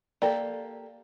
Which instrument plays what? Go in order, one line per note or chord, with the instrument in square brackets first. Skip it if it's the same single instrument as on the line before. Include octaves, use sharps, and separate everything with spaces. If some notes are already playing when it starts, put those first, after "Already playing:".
[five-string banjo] A#3 G4 A4 [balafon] D5